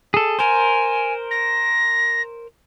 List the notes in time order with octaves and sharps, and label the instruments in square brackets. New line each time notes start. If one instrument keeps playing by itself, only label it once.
[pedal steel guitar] G#4 A4
[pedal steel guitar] A#4 C5 [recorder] G#5
[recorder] A#6